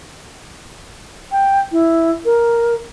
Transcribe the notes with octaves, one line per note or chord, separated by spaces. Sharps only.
G5
E4
A#4